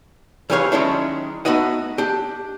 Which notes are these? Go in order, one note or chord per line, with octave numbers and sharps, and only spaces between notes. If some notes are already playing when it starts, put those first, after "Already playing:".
F2 E3 G4 G#4 C#5 F5
D#3 F#3 G#3 C#4 D4 E4
A3 B3 D#4 F#4 D#5 F#5
D4 G4